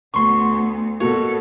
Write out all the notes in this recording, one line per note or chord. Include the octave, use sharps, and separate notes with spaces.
D2 B3 C6 C#6
B2 A#3 F#4 A4 C#5